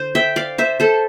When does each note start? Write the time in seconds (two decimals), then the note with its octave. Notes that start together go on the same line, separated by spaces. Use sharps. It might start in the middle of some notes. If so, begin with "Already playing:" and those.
Already playing: D3 C5
0.15 E5 G5
0.36 D5 F5
0.58 C5 E5
0.80 A4 C5